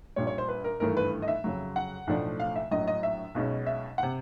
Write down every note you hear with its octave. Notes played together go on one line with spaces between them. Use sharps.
A#1 A#2 G3 C#5
C#5
C5
B4
A#4
G#1 G2 E3 A3 A#4
B4
D#5
E5
F2 C#3 F#3
F#5
B1 A2 F3 A3 D4
F5
E5
A#1 A2 F#3 D#5
D#5
E5
B1 B2 G#3 C#4
E5
C3 F#5